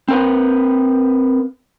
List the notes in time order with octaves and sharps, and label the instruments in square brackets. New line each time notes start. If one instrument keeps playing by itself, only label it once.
[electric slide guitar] C4 A#4 B4